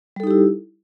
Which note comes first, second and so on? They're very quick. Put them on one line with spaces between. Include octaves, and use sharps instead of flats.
G3 A4 D#4 G4 E4